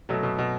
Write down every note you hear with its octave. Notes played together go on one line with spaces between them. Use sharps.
B2 F#3 A3
B2
B2